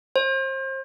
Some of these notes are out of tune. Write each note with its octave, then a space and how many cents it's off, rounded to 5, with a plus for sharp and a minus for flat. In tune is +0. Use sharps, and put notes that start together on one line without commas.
C5 +35